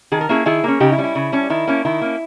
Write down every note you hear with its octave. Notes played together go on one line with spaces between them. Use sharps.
D#3 G#4
A#4
A#3 C#4 E4 G#4
D#3 E4 G#4
A#3 C#4
C#3 D#4 G4
E4
G3 C#4
E4
C#3
G3 C#4
D#3 E4
A#3 C#4
D#3 E4
A#3 C#4